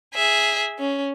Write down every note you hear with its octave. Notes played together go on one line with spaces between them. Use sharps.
G#4 E5
C#4